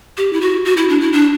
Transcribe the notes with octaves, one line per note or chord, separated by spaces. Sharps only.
G4
E4
F#4
F#4
E4
D4
E4
D4